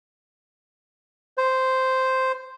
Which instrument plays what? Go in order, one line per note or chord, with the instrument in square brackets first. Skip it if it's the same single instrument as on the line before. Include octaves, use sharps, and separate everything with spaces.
[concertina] C5